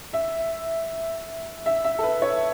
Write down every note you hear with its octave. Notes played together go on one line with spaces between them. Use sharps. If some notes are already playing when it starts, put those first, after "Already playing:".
E5
E5
E5
A4
B4
C#5